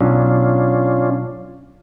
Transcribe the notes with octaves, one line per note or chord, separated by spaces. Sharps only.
B1 C#4 D4 F4